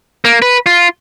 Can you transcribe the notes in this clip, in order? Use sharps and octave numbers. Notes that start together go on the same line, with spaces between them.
A#3
B4
F4